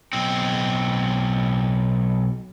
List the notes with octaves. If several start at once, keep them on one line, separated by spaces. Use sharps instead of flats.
B1 C4